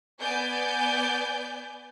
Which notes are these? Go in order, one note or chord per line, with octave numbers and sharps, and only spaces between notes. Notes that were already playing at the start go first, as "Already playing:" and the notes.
B3 D5 G#5 G6